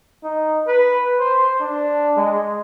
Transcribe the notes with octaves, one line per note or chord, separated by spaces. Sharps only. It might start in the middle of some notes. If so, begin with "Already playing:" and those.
D#4
B4
C5
D4
G#3